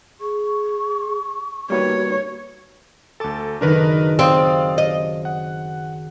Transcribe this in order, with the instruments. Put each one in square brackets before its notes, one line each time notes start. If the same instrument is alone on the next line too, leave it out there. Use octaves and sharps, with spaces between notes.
[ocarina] G#4 [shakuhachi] C#6
[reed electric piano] G3 A#3 B4 [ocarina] F#4 [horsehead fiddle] C#5
[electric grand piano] D2 A4 [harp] A5 D6
[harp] F#1 D#3 D#4 [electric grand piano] D4 A#4 B4
[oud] C4 [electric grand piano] D5 F5 D#6
[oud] D#5
[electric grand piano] F#5